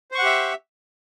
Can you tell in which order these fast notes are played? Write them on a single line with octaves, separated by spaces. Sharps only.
C5 C#6 F#5 G4 E5